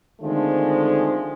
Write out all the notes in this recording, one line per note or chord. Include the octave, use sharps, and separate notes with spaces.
D3 D#3 F3 G#3 A3 C4